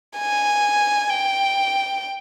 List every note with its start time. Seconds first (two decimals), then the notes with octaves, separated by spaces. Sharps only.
0.18 G#5
1.10 G5